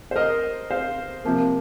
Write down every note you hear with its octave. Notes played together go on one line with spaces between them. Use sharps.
C5
A#4 D#5
C5 F5
C3 F3 A#3